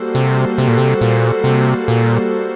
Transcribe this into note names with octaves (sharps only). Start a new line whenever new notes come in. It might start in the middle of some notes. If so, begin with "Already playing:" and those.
Already playing: G3 A#3 F#4 A4 C5
C3
C3
A#2
C3
A#2
C3
A#2